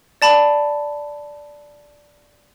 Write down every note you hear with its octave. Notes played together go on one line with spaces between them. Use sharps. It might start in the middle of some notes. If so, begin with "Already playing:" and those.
D5 A5 B5